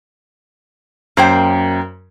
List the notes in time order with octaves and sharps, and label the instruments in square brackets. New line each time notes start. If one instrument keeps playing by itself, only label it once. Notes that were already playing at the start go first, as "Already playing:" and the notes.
[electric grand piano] F#2 [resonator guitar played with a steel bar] A#3 C5 G5